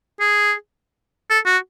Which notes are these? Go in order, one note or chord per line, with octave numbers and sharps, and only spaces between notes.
G#4
A4
F#4